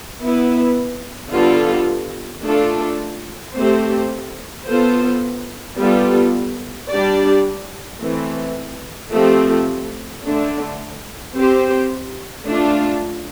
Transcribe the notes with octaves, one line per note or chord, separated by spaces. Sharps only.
B3 E4 B4
D3 G3 B3 F4 A4
A3 D4 F4 A4
A3 C4 G4 C5
B3 F4 A4 C5
G3 B3 F4 A4
G3 D4 G4 D5
E3 A3 C4
F3 A3 C4 G4
D3 A3 D4
C4 G4 C5
A3 D4 F4